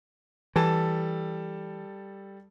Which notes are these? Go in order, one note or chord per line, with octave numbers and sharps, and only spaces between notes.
E3 G3 A4 A5